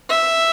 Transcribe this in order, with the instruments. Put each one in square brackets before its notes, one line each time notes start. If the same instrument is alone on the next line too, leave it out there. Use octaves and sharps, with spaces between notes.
[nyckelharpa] E5